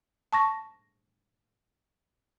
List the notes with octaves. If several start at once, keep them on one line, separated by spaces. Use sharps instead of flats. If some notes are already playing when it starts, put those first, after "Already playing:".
A5 C#6 A#6